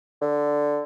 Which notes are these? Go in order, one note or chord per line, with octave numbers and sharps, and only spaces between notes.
D3